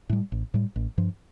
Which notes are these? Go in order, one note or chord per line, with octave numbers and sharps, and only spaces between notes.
A2 G3
A1
A2 G3
A1
G2 F3